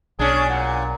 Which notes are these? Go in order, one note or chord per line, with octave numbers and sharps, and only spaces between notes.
B1 C#4 D4 G#4
A#2 F#5